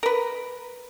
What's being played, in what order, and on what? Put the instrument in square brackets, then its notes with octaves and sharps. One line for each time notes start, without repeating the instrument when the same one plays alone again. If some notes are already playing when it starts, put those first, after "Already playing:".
[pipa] A#4 B4